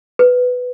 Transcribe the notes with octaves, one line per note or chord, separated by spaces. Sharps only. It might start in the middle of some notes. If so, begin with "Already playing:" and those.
B4